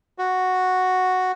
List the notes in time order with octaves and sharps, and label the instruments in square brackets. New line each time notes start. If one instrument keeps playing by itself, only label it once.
[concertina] F#4